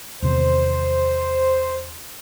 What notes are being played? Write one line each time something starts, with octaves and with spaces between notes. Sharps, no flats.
E2 C3 D#3 C5